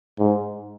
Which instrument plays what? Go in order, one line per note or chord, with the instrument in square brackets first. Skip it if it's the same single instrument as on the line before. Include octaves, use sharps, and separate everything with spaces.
[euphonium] G#2